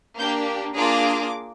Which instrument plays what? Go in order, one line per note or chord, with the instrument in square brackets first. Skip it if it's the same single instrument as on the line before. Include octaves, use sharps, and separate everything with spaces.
[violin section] A#3 D4 G4 G6
A#3 D4 F4 G#4 D6